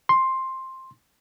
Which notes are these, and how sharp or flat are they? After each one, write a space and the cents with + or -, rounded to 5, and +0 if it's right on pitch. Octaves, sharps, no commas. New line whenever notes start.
C6 +10